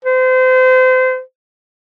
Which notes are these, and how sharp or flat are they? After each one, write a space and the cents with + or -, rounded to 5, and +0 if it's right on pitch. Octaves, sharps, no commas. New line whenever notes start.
C5 -30